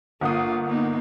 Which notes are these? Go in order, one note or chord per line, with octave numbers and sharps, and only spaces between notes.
G1 A#3 F4 F#5 D#6
A#3 B3 D#4